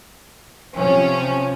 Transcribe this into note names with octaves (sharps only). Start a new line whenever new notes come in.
C3 F3 C#4